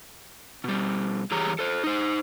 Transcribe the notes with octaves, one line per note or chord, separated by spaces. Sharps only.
B2 G3
G2 E3 G4 G#4 C#5 A#5
A4 C5
D#4 C5